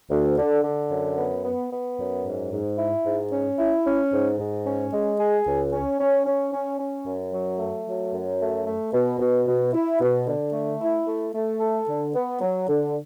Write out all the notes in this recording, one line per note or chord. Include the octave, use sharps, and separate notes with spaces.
D2
D3
D3
F#2
B3
B3
B3
F#2
G#2
G#2
E4
G#2
C#4
E4
C#4
G#2
G#2
C#4
G#3
G#4
C#2
C#4
C#4
C#4
C#4
C#4
F#2
F#3
A3
F#3
F#2
A3
A3
B2
B2
B2
E4
B2
D3
A3
E4
A3
A3
A4
D3
B3
F#3
D3